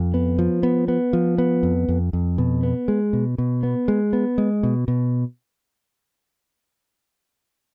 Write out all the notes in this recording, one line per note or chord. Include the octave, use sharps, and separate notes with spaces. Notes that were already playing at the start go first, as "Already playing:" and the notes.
Already playing: F2
B3
F3
B3
B3
F3
B3
F2
F2
F2
B2
B3
G#3
B2
B2
B3
G#3
B3
G#3
B2
B2